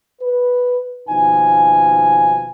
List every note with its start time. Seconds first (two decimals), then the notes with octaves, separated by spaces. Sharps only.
0.21 B4
1.08 D#2 B2 F3 D#4 G#5